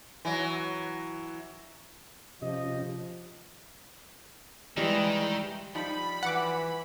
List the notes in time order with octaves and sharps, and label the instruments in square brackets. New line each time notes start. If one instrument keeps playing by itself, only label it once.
[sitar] E3 F#3
[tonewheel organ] C3 C#4 G4 [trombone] F3 [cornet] D#5
[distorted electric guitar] D#3 [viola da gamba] E3 G#3 [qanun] G3 D#5 C#6
[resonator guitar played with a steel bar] F3 G3 D#4 [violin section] B5
[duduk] E3 [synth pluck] F#5 D6